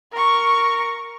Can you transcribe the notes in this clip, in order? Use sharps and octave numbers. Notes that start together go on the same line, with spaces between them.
A#4 C#6